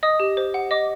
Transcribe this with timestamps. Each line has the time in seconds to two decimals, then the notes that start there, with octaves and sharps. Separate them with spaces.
0.03 D#5 D#6
0.20 G4
0.37 C5
0.54 F#5
0.71 D#5 D6